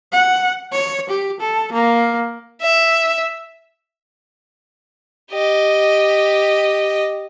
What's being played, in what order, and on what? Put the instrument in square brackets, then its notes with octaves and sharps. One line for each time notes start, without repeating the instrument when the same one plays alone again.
[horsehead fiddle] F#5
C#5
G4
A4
A#3
[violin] E5
[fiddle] G4 D#5